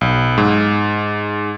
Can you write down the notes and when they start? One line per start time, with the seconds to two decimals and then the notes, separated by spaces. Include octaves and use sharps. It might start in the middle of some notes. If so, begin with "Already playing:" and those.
0.01 B1
0.38 G#2